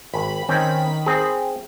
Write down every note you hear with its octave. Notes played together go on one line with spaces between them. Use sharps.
G#1 B5
D#3 C4 C#4 G5 B5 B6
C4 G#4